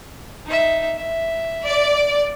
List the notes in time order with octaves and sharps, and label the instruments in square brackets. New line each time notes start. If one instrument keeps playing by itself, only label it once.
[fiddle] D#4 E5
E5
[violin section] D5